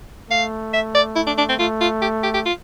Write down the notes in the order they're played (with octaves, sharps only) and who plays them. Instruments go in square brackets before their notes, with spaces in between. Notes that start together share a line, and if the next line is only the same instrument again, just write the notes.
[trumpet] A3 [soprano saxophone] F5
[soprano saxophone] E5
D5
E4
D4
D4
C4
[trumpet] A3 [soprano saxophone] F4
[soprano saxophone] F4
G4
G4
G4
F4